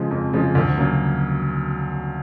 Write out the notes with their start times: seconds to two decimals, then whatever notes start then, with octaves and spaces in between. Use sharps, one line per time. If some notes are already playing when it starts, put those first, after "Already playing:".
Already playing: C#3 F3 G#3
0.11 F2
0.33 C#3 F3 G#3
0.55 D2
0.77 C#3 F#3 A#3